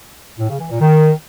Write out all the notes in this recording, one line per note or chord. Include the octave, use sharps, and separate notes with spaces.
A2
C#3
E3
A#2
D#3